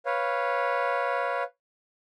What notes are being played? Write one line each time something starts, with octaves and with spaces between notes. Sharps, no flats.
B4 C#5 F5